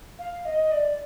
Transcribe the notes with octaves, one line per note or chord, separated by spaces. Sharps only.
F5
D#5
D5